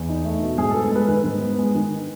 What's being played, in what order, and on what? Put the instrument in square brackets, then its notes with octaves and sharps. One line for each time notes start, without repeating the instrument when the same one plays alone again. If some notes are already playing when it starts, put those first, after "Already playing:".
Already playing: [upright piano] E2
D#4
A3
B2
G#2 G#4
A4
B3
A4
G#3 B4
D#3 B4
G#2
B3
G#3
D#3